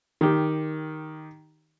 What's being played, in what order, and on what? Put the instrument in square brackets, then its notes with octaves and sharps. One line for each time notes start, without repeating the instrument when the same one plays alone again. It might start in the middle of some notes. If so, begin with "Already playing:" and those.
[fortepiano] D#3 G4